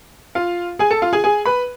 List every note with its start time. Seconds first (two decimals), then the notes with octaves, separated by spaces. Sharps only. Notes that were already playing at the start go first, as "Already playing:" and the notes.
0.35 F4 F5
0.79 G#4 G#5
0.91 A4 A5
1.02 F4 F5
1.13 G#4 G#5
1.24 G#4 G#5
1.46 B4 B5